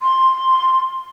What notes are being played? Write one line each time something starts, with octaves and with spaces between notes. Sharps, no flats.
C6